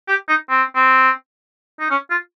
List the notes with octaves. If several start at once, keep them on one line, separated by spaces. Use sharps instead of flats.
G4
D#4
C4
C4
D#4
C#4
F4